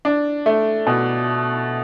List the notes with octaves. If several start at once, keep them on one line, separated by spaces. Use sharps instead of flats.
D4
A3
B2